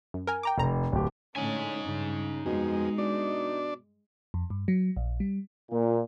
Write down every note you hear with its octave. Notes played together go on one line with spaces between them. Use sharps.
F#2
A#4 G#5
G5 A#5 D6
F1 F2 A#5
D1 G4
A2 D3 C#4 D#4 G#5
G2 C#3
F2 B2 G#3 G#4
B2 D4 D5
F2
G2
F#3
A#1
G3
A#2